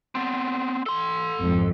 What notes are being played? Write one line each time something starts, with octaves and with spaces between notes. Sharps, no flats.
B3 C4
A4 C6
G#1 F2 G#2